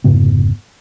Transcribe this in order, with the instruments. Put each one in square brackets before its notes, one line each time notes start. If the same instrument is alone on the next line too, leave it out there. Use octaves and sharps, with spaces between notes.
[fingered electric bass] F1 G#2 C#3 B3